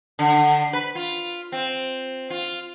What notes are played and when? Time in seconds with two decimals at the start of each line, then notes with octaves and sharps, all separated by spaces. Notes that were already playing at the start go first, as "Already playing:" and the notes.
0.19 D3
0.73 B4
0.95 F4
1.52 C4
2.30 F4